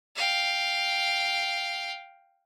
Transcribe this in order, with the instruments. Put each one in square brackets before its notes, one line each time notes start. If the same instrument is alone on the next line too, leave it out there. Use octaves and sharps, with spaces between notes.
[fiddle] F5 G5